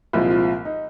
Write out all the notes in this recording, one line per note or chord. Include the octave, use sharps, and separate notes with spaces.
C2 A#2 F3 G#3 F4
F4
D#4